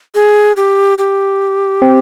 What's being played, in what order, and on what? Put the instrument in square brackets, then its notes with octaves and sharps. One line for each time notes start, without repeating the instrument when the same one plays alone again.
[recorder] G#4
G4
G4
[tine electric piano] C4